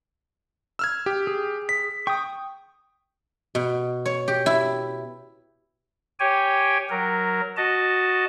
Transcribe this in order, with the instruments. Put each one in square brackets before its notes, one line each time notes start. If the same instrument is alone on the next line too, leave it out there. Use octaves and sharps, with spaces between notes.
[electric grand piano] E6 F6 G#6
G4
[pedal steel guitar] G#4
[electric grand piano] B6
[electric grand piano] G5 [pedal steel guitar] C#6 D#6
[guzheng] B2
C#5
G4
E4
[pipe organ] G4 C#5 G5 G#5
F#3 A#4
F#4 D#5 A5